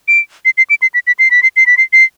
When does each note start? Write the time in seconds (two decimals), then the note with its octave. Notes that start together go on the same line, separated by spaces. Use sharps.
0.08 D7
0.45 C7
0.58 C7
0.70 D7
0.82 C7
0.94 B6
1.07 B6
1.19 C7
1.31 B6
1.43 C7
1.56 C7
1.66 B6
1.78 C7
1.93 C7